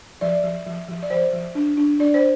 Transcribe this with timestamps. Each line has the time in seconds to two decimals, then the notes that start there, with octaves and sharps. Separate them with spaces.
0.21 F3 D5
0.44 F3
0.66 F3
0.88 F3
1.03 D5
1.10 F3 C5
1.33 F3
1.55 D4
1.77 D4
1.99 D4 D5
2.14 C5